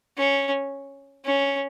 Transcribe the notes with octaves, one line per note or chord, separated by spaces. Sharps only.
C#4
C#4